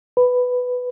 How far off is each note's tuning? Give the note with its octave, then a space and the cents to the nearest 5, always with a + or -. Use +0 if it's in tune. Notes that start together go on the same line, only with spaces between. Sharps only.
B4 +5